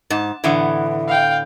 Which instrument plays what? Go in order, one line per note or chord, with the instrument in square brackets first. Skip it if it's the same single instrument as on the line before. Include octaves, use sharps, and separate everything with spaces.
[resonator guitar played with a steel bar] G#2 [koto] A5
[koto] A2 D3 B3 [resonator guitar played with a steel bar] E3 [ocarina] E5
[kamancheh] F5 G5